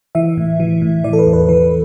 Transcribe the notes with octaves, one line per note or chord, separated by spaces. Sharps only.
E3 E5
A2
E3
A2
E3 D5
A4
B4
E2
B4
E3 B4